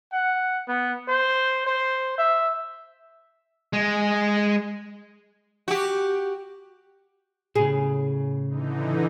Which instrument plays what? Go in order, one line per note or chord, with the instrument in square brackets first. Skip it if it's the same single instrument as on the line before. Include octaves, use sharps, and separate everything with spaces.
[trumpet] F#5
B3
C5
C5
E5
[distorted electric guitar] G#3
[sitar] F#4 G4
[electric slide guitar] A2 C#3 [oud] G#4
[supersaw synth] D3 E3 D#4